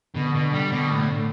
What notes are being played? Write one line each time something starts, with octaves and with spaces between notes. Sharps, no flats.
B2 D3
B2
G3
B2
A2